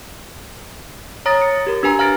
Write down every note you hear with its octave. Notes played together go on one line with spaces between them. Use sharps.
C#5 A#5 D#6 A6 A#6
C#7
G4 A#4
D4 G4 B4 G#5 A#5
F5 A#5 F6 A6 A#6 D7